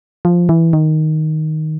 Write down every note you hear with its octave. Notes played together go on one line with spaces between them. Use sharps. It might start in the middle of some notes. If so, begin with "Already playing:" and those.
F3
E3
D#3